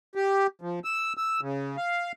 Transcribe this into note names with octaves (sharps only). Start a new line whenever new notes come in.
G4
F3
E6
E6
C#3
F5